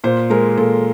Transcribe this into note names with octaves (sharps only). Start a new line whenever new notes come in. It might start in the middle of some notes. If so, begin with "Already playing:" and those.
A#2 C5
G#3 A#4
A#2 A4